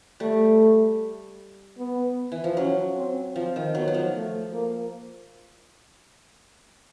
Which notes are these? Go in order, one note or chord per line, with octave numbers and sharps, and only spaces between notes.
G3 A3
B3
E3
F3
F#3 C#4
C4
F3 C4
D#3
F#3 B3
F#3
F3
A3
A#3